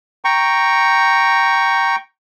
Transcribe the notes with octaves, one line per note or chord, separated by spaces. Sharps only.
G5 A#5 C#6